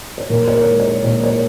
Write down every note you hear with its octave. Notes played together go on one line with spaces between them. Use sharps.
C#5
A#2 A#4
C#5
A#4
G#3
C#5
A#2 C#5
C#5